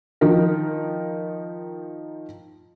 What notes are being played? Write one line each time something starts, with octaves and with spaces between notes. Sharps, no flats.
D#3 F3 D#4 A#4